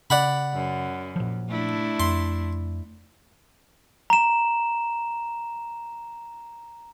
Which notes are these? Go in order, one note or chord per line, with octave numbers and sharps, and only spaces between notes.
C#3 D5 F#5 B5
F#2
A#2 F3
A3 D4 E4
F2 C6
A#5 E7